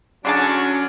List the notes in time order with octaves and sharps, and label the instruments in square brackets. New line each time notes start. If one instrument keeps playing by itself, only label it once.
[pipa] D3 G#4 A5 [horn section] F#3 D4 [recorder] C#4